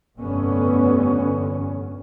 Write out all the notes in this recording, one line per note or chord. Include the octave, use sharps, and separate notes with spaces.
F1 G2 D3 B3 C#4